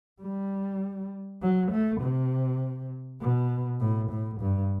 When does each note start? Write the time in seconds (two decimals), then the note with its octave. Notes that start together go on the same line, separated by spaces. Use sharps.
0.22 G3
1.42 F#3
1.71 A3
2.01 C3
3.21 B2
3.80 A2
4.10 A2
4.41 G2